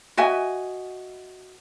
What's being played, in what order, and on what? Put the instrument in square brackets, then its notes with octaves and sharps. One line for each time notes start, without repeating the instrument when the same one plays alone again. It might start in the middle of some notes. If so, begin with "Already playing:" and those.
[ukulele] F#4 D#5 E5 G#5